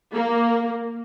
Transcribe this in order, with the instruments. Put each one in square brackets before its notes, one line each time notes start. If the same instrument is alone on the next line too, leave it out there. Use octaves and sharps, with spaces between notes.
[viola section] A#3